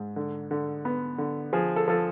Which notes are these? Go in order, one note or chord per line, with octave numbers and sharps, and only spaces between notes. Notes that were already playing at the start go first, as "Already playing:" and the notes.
Already playing: G#2
D3
D3
B3
D3
F3 G#4
A4
F3 A4